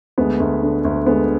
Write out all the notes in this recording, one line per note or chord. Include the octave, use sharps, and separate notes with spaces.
D2 G#3 B3
D2
D3
D2
D3 G#3 B3